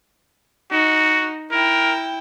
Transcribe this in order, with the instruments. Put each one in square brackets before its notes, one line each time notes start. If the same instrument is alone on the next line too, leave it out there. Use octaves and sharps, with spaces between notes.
[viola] D#4 [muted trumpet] F#4
[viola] E4 G5 [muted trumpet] A#4